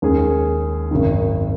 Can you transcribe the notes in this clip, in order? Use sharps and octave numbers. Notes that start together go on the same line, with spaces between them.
D#2 D#3 G#3 C#4 G#4
G#1 F#2 D#3